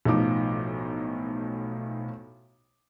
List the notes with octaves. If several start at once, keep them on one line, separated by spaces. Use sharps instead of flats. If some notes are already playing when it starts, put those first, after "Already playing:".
B1 A2 F3 D#4 D6